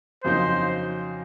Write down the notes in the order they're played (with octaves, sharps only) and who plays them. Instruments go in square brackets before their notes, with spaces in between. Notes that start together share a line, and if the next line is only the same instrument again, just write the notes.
[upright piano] F2 C#3 F#3 A#3 D#4 [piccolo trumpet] C5